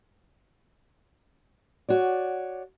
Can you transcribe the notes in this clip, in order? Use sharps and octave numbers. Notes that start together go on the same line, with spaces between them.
F#4 C#5 D5